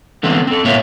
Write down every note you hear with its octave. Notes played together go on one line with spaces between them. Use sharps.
D3 E3 A3 B3 C4
C4 A4
A2 A#3 B3 F4 C#5 E5